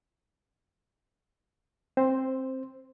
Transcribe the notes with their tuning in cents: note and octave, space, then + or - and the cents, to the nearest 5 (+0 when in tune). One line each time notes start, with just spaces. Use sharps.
C4 +15 C5 +0